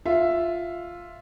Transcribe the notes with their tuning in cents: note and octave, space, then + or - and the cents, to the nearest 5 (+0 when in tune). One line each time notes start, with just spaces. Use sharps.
F4 +0 E5 +5